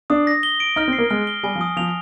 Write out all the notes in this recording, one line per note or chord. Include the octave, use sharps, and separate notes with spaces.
D4 D#6
A#6
G7
D7
D#4 F6
C4
C7
A#3
G#3 F6
G7
G3 G#5
F3
D#6
F3 F7